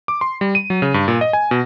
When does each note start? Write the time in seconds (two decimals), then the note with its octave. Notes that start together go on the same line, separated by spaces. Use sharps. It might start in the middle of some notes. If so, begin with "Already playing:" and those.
0.08 D6
0.21 C6
0.41 G3
0.55 D#7
0.70 F#3
0.82 C#3
0.94 G2
1.08 A#2
1.21 D#5
1.33 G#5
1.51 B2